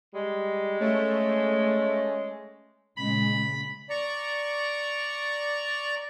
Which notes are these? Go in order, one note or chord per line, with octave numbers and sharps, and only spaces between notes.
G3 G#3
A3 C#4
A#2 C#3 G#3 B5
D5 A#5 C#6